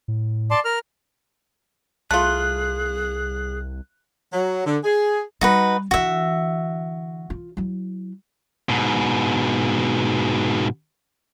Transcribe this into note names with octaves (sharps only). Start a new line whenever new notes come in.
A2
D5 A5 C6
A#4 F6
C2 A3 F4 G#4 F#6
F#3
D3
G#4
G3 D#4 F#4 B4
D3 E3 F#4 E5
F4
F#3 E4
G#2 B2